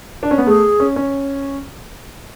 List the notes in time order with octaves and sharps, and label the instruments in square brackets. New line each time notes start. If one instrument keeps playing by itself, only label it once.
[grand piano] D4
C#4
B3
[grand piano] A3 [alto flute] G#4
[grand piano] C#4
C#4